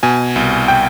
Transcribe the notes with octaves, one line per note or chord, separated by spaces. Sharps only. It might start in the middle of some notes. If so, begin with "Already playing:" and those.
B2 G#5
C2
G5